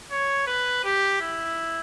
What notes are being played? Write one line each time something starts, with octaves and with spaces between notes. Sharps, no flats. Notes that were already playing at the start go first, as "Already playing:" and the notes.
C#5
B4
G4
E4